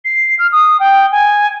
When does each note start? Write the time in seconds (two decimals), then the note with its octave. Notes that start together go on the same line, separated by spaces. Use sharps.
0.05 C7
0.39 F6
0.52 D#6
0.80 G5
1.12 G#5